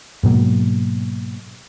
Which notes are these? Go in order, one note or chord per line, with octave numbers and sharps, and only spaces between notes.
G#2 B2 F#3 A#3